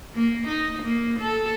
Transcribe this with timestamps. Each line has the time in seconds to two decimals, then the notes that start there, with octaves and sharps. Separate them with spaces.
0.14 A#3
0.48 D#4
0.83 A#3
1.20 A4